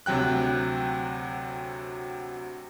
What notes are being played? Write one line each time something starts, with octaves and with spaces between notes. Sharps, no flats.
D2 C3 F#3 G5 F#6